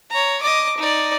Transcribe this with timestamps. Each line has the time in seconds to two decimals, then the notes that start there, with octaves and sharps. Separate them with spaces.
0.10 C#5 A#5
0.41 D#5 D6
0.78 D#4 D5